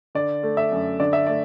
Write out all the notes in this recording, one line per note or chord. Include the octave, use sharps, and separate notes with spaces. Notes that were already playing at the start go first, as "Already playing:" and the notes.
D3 D5
A3
E5
F#2
D3 D5
E5
A3 D5